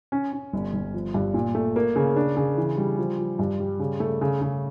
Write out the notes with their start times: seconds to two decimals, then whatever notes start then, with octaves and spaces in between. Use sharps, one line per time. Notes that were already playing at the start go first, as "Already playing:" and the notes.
0.12 C#4
0.32 C#4
0.53 G1
0.74 G1
0.94 F3
1.14 G2
1.34 A#2
1.55 A3
1.76 A#3
1.96 C#3
2.16 D4
2.37 C#3
2.57 E3
2.78 G3
2.98 F3
3.18 F3
3.39 G2
3.60 G3
3.79 C#3
4.00 A3
4.21 C#3
4.41 C#3